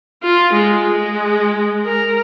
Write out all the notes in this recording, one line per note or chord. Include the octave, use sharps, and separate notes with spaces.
F4
G#3
G#3
A#4